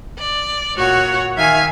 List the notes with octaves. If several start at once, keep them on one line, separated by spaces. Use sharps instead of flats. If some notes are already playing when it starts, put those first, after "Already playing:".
D5
A#2 F#4 C#5 F#5
D#3 E5 F5 G#5 G#6